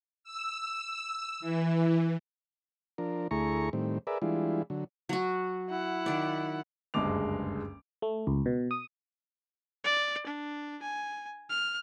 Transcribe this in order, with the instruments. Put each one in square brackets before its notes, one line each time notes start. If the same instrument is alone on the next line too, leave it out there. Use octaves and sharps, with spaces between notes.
[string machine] E6
E3
[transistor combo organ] F3 D4 A#4
D2 A3 E4 G#4 A#5 C#6
A2 D#3 G3 C4
G#4 A#4 B4 D5 E5
E3 G3 G#3 D4 E4 F4
D3 F#3
[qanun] F#3 F#4
[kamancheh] E4 F#5
[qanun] D#3 D5
[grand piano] F#1 D2 G2 G#3 D6 F7
[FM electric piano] A3
C#2
B2
D#6
[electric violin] D5
D4
G#5
F6